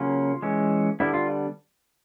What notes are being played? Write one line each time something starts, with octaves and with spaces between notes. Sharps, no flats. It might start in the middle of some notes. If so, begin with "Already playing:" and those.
Already playing: C#3 F#3 A#3 C#4 F4
E3 G#3 C#4
D3 G3 B3 D4 E4
F4